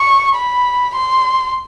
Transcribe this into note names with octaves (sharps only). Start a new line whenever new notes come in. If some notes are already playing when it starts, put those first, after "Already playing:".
Already playing: C#6
B5
C6